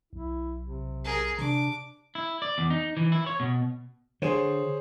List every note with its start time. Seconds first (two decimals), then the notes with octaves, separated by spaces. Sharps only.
0.13 B1 E4
0.61 C3
1.04 G#4 A#4
1.38 C3 D4 D6
2.15 E4
2.42 D5
2.58 E2
2.70 D#4
2.97 E3
3.12 E4
3.26 C#5
3.40 B2
4.22 D3 G#4 C5 C#5